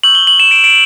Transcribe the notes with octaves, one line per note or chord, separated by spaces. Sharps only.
C#6 E6 G6 F#7
G7
F#7
E7
D7
D7